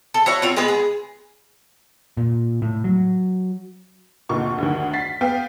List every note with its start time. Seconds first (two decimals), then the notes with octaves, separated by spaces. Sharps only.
0.14 A4
0.26 E4 F#4 C#5 F#5
0.42 C4 F4 C#5
0.56 G#3 B3 G#4 B4
0.68 G#4
2.17 A#2
2.62 A2
2.84 F#3
4.29 F1 D2 A#2 D#4 C#6
4.58 D2 G2 D#3
4.94 A6 B6 C7
5.21 B3 F5 G5